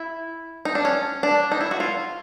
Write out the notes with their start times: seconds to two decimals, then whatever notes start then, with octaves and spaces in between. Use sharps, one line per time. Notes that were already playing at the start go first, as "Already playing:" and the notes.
Already playing: E4
0.65 D#4
0.75 D4
0.85 C#4
1.23 D4
1.52 D#4
1.61 E4
1.71 F#4
1.80 F4